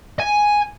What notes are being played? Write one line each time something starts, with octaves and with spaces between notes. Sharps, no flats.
G#5